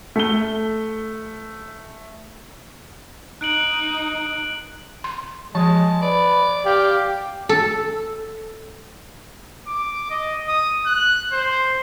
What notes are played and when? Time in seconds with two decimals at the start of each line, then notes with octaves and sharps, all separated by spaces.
0.16 A3 G7
3.41 D#4 F#6 D7 F#7
5.04 C6
5.55 F3 G#3 A5
6.02 B4 D5
6.66 G4 F5
7.49 A4
9.67 D6
10.10 D#5
10.48 D#6
10.87 F#6
11.33 C5